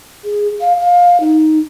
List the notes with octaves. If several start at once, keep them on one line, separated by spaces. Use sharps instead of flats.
G#4
F5
F5
D#4